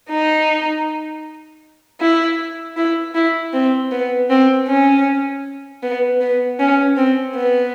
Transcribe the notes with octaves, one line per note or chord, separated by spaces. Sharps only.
D#4
E4
E4
E4
C4
B3
C4
C#4
B3
B3
C#4
C4
B3